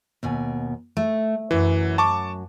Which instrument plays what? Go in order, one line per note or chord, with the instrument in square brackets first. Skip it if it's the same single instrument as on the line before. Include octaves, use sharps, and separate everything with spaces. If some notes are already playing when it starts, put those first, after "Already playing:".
[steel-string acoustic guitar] D#2 B2 G#5
A3
[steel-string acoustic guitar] F#2 F#3 [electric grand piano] E3
[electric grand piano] A5 C#6 D6